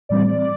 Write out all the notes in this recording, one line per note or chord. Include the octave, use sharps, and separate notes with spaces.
A2 E3 G3 C4 D5
D5